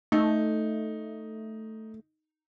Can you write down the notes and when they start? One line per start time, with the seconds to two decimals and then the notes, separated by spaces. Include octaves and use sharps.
0.12 A3 D#4